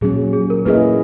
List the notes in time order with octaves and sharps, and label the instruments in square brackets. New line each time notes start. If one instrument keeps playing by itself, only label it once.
[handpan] A#2 F#3 C#4 [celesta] G#4
[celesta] G#4
A#4
[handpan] A#3 C#4 E4 G#4 D#5 [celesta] B4